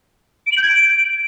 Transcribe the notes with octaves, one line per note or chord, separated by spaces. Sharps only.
D7
F#7
G6
G#6
D7